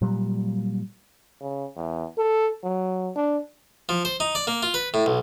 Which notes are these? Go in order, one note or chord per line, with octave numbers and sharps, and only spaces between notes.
A#2 F#3 G3
C#3
E2
A4
F#3
D4
F3
C5
D#4
D5
A#3
F4
B4
A2
B1